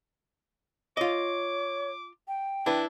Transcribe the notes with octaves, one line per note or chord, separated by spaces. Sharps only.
F4 C#5 D#5 D6
G5
D4 E4 B4